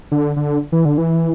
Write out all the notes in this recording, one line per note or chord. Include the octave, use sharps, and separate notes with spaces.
D3
D3
E3
D3
E3